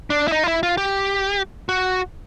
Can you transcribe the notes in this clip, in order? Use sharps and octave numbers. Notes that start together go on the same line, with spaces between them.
D4
E4
D#4
F4
E4
F4
G4
F#4